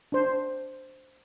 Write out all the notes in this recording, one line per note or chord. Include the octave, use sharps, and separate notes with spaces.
D4 C5